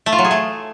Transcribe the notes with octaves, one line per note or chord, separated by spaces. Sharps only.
A3
F4
F#3
G#4
A3